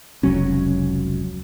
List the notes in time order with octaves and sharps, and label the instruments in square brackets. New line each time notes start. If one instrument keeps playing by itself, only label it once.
[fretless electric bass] F1 C#2 F#3 C#4